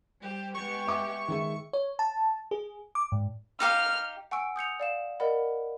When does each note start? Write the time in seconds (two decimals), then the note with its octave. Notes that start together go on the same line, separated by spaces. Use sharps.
0.20 G3 G4 C5
0.55 G#3 B3 G4 C#6
0.87 E5 D6
1.28 D#3 G#3 E5
1.73 C#5
1.99 A5
2.51 G#4
2.95 D6
3.12 G#2
3.60 D#4 G4 F5 F6
4.31 F#5 G#5 C#6 E6 D7
4.56 D#6 G6 C#7 F7
4.80 D5 F5 E7
5.20 A#4 D5 D#5 F#5 B5